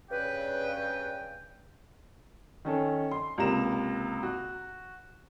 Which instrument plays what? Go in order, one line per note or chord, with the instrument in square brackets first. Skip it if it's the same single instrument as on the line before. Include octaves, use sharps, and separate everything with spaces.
[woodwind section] G2 C#3 [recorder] B4 [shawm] G5
[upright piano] D#3 C#4 A4
C6
C#2 C3 A#3 A#5 E7
F#4